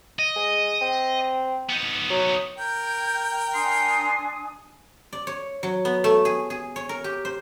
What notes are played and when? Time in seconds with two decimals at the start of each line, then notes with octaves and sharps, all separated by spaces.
0.19 D#5
0.36 G#3
0.81 C4
1.69 B3 D#4
2.10 F#3
2.58 A#4 G5 G6
3.54 D4 G#5 C6 D#6
5.13 D5
5.27 C#5
5.63 F#3
5.85 B3
6.04 A3
6.25 G#4
6.50 G#4
6.76 C#5
6.89 A#4
7.04 G4
7.25 C5